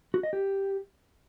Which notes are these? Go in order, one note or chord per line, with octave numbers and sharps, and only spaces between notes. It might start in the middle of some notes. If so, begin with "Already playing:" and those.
F#4
D#5
G4